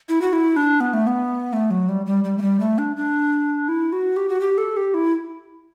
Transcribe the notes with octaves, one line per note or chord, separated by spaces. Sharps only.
E4
F#4
E4
D4
B3
A3
B3
A3
F#3
G3
G3
G3
A3
G3
A3
D4
D4
E4
F#4
G4
F#4
G4
A4
G4
E4